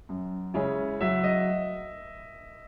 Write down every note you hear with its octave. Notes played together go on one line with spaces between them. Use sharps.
F#2
C#3 G#3 C#4 E4
F#3 E5
D#5